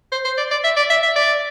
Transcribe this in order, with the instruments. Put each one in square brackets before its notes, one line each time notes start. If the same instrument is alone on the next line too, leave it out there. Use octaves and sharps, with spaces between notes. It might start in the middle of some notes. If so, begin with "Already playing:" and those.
[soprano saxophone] C5
C5
D5
D5
E5
D5
E5
E5
D5